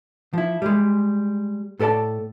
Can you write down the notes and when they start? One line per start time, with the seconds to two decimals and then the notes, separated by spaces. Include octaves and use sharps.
0.34 F3 E4
0.62 G3 G#3
1.79 A2 A4 A#4 D5 A5